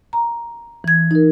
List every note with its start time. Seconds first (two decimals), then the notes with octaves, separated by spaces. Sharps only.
0.13 A#5
0.84 E3 G#6
1.11 D#4 A#4